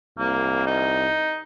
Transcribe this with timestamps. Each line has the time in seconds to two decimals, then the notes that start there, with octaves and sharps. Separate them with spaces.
0.19 C2 A#3
0.67 D#4